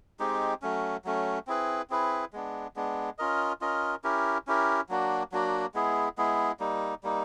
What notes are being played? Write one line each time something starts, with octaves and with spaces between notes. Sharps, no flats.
G#3 C4 D#4 G4
F#3 A3 C#4
F#3 A3 C#4
C4 E4 G#4 B4
C4 E4 G#4 B4
G#3 B3 D4
G#3 B3 D4
C#4 F4 A#4 D#5
C#4 F4 A#4 D#5
C#4 E4 G4 A#4
C#4 E4 G4 A#4
F#3 A#3 D4 F#4
F#3 A#3 D4 F#4
G#3 B3 E4 G#4
G#3 B3 E4 G#4
G3 A#3 D#4
G3 A#3 D#4